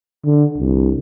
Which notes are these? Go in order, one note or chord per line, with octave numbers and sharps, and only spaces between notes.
D3
C2